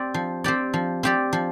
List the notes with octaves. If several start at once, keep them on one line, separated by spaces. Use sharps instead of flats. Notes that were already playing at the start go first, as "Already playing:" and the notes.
Already playing: C4 G4 D5
F3
C4 G4 D5
F3
C4 G4 D5
F3